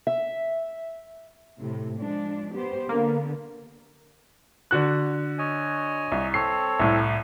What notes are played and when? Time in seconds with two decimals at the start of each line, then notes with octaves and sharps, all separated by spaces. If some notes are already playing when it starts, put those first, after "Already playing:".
0.07 E5
1.59 A2 C3
1.98 F3 G#3 D4
2.53 B3 G4 C5
2.89 D3 A#3 B3
4.71 D3 F#4 F#6
5.38 C#5 D#5 G#5
6.12 C2
6.34 C4 A4 C#5 C7
6.79 C2 A2